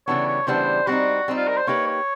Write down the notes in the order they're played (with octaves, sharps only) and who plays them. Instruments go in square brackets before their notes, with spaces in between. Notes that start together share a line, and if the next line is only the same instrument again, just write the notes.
[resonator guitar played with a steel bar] C#3 E3 G3 B3 D4 [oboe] C#5
[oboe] C#5
[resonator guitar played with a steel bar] C#3 E3 G3 B3 D4 [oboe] C5
[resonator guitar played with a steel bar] G3 C4 D#4 [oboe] F#4
[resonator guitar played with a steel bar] G3 C4 D#4
[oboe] F4
A#4
C5
[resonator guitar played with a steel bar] A#3 D#4 G4 B4 [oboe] C#5
[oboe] C#5